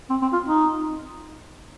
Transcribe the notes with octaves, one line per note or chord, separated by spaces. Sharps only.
C4
C4
F4
D#4